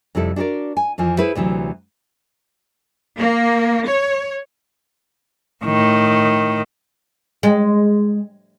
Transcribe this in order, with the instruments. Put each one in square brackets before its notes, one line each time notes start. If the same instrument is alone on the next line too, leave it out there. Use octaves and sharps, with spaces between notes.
[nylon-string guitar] F2 C3 G3 E4 A4
D4 F#4 G#4 A#4 D5
G#5
F2 E3 F3 G#5
E4 G#4 B4 C5 E5
D2 C3 E3 F#3
[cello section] A#3
C#5
[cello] A2 D#3
[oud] G#3